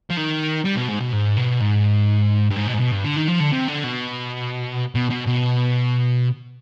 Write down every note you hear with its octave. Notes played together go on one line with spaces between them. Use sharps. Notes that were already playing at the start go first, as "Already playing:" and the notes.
F3
D#3
G3
B2
G#2
B2
G#2
B2
G#2
G2
G#2
B2
G#2
B2
G2
D3
D#3
F3
D3
C3
D3
B2
B2
B2
B2